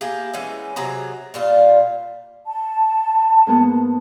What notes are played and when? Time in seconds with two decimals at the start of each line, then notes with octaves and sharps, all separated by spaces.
0.01 A#3 E4 G4 G#4
0.34 E3 G#3 B3 C#4
0.76 C3 F#3 G#4 A#5
1.34 A#2 G3 F4
2.47 A5
3.47 G#2 A#3 B3